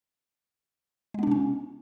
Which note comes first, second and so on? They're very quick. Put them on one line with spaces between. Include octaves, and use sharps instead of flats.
G#3 B3 D4 C3 C#4